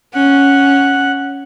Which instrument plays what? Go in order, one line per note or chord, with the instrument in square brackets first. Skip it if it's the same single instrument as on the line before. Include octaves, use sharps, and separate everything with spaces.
[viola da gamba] C#4 [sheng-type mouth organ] F#5